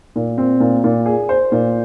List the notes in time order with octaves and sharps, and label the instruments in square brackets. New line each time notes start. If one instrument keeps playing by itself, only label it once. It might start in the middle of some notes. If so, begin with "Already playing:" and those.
[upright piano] A#2
C4
A#2
A#2
G#4
C5
A#2